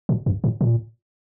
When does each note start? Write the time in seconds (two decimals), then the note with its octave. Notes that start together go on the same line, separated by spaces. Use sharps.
0.09 A#2
0.26 F#2
0.44 A2
0.61 A#2